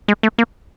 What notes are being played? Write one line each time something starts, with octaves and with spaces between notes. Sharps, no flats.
G#3
A3
A#3